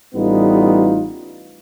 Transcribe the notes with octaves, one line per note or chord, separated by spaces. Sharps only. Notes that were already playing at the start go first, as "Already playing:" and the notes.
A1 A2 G3 B3 D#4 F4